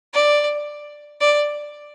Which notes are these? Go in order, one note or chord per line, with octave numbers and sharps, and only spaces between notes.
D5
D5